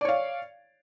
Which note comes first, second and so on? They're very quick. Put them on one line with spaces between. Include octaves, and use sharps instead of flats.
D5 C#5 F5